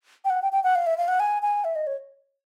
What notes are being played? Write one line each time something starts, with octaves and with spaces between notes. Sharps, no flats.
G5
F#5
G5
G5
F#5
F5
E5
F5
F#5
G#5
G#5
E5
D#5
C#5